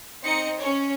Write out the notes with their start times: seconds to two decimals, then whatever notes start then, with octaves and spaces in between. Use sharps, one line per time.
0.24 C4 D#4 D#5 C#7
0.58 C#4 C#5